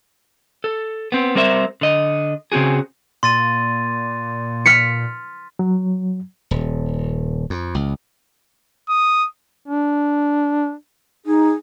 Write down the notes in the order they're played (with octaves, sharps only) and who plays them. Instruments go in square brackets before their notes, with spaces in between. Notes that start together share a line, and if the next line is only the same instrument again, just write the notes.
[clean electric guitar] A4
B3 C4
G3 C4 A#4 C5 E5
D3 D#5
C#3 C4 D#4 F#4 G#4
[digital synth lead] A#2 [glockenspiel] C6 A6 D#7
[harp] F6 B6 C#7
[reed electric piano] F#3
[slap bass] D#1
F2
C#2
[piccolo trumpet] D#6
[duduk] D4
[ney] D#4 [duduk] G#4